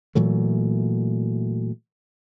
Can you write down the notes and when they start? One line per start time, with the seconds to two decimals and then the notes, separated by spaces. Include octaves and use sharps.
0.15 A#2 E3 F#3 A3